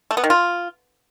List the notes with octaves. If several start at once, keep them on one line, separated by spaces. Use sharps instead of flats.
A3
B3
D#3
F4